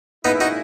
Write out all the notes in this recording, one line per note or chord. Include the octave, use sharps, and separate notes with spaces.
A#2 G#3 B3 C#4 D#4 E4
D#4 F#4